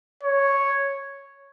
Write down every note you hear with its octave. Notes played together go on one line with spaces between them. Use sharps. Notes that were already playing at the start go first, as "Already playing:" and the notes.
C#5